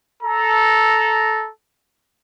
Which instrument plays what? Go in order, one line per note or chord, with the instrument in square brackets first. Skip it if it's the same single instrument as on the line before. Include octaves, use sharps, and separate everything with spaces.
[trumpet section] A4 A#5